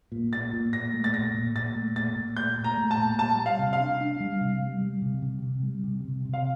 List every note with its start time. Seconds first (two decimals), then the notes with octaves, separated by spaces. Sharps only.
0.12 A#2
0.33 A#2 A6
0.53 A#2
0.73 A#2 A#6
0.94 A3
1.04 A6
1.14 A#2 A#6
1.34 A#2
1.55 A#2 A6
1.75 A3
1.96 A#2 A6
2.16 A#2
2.36 A3 G6
2.57 A#2
2.64 A#5
2.77 A3
2.91 A5
2.97 A#2
3.19 G3 A5
3.39 G3
3.46 F5
3.59 C3
3.73 F5
3.80 D4
4.01 D4
4.20 G3
4.41 C3
4.61 G3
4.81 G3
5.02 C3
5.22 C3
5.43 C3
5.63 G3
5.84 C3
6.04 C3
6.25 C3
6.34 F5